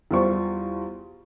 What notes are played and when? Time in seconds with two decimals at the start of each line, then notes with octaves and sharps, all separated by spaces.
0.11 E2 G3 F4 C5 C#6